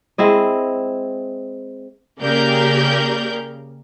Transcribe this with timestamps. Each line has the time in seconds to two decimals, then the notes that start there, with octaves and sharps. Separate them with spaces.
0.18 G#3 C4 E4 D#5
2.20 C#3 A#3 G4 A#4 D5 G6